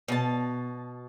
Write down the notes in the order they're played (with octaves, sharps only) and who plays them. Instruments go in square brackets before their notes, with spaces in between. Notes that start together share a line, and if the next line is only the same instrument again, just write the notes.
[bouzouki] B2 A5